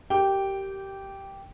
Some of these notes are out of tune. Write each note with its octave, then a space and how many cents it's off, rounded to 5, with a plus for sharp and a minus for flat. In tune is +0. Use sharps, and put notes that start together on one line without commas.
G4 -15 A#4 -15 G5 +0